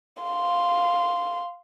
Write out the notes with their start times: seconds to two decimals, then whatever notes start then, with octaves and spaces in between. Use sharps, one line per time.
0.23 F5 C6